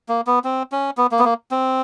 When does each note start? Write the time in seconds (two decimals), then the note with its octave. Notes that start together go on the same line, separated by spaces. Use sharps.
0.09 A#3
0.27 B3
0.44 C4
0.72 C#4
0.97 B3
1.11 A#3
1.19 B3
1.25 A#3
1.51 C4